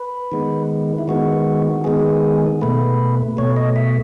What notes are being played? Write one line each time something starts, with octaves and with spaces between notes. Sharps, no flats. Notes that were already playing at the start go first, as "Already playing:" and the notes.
Already playing: B4
D#3 G#3 B3
E4
D#3 G#3 B3 F#4
D#3 G#3 B3 G#4
B2 A3 B4
B2 A3 C#5
D#5
E5